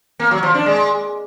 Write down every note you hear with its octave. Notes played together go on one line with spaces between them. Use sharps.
A#3
F#3
F3
D4
G#3